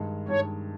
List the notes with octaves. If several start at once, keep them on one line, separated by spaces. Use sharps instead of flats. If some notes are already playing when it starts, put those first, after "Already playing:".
Already playing: G2 D#3 G#3
G2 D#3 G#3 C#5